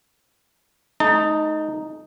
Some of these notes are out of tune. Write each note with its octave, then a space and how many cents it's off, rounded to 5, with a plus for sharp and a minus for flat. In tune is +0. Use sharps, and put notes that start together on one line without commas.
A3 -40 D#4 +0 A5 +35